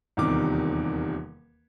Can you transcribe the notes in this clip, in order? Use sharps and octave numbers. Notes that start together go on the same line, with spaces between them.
D#1 E2 C3 D#3 D6